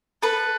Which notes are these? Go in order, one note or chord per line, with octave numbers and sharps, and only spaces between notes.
A4 B4